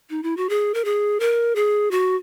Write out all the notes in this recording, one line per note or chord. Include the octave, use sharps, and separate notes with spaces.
D#4
E4
F#4
G#4
A#4
G#4
A#4
G#4
F#4